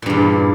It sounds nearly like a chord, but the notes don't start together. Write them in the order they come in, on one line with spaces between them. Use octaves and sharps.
A#2 G2 E2